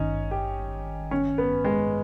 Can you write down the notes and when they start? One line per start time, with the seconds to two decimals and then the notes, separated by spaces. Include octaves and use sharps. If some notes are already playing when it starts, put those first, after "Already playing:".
Already playing: G#1 G2 D#3 C#4 D#4
0.31 G4
1.11 C#4
1.38 B3
1.65 G#3